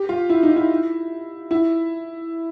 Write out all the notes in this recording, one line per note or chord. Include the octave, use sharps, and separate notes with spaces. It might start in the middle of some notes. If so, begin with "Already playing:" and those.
Already playing: G4
F4
E4
D#4
E4
E4